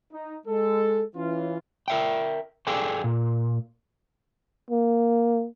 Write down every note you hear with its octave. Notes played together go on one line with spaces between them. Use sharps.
D#4
G#3 A4
E3 C#4 F4
A#4 E5 G5
G#4 A4 D5 F5 G5 G#5
A#2
A#3